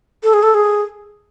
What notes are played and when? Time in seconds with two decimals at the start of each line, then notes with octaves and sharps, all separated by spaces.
0.23 A4
0.34 G#4
0.43 A4
0.54 G#4